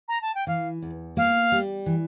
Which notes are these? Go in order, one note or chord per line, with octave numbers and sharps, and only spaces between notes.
A#5
A5
G5
E3 F5
E2
A#3 F5
G3
E3